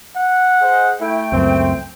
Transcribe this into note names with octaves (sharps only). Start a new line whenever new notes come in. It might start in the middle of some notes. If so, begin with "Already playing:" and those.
F#5
G#4 C5 D#5
A3 E4 G5
C#2 F#2 C4